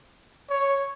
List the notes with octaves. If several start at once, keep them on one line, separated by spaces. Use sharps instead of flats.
C#5